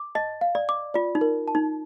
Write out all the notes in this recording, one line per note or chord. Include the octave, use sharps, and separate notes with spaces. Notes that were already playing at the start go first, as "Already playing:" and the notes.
Already playing: D6
D#5 A5
F5
D5
D6
F4 D5
D#4
A#4
A5
D#4